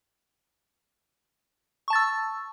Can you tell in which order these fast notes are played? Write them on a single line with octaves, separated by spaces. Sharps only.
C#6 A5 A6 E6